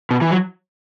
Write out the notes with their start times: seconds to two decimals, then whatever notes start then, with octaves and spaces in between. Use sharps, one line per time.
0.11 B2
0.21 E3
0.31 F#3